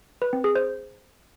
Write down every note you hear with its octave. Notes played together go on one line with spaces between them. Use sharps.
B4
C4
G#4
C5